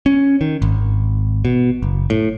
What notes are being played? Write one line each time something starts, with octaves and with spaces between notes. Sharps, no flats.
C#4
D#3
G#1
B2
F#1
A2